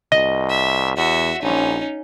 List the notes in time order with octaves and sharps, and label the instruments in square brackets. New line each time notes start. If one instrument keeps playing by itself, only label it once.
[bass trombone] C2 [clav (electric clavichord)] D#5
[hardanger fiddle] E5
[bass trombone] E2 [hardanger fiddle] F#4 E5
[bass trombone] A#1 [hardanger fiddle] C#4 D#4